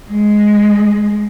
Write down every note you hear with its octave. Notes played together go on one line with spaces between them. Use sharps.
G#3